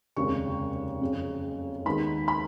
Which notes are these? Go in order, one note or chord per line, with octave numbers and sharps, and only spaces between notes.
F1 D#2 C#3 G#3 C#6
F#1 F2 C#3
D#2 D#3 G#3 B3 D#4 B5
B5